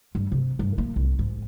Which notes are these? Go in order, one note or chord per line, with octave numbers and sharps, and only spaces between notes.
G2
C3
G2
A#3
C2
G#2